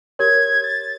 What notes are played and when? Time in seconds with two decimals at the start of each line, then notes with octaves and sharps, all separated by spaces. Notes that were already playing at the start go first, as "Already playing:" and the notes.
0.19 G4 A#4 C#5 G#6
0.64 A6